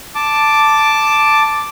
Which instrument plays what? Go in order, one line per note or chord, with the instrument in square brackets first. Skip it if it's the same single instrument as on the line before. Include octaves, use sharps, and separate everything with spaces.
[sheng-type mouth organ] A5 D6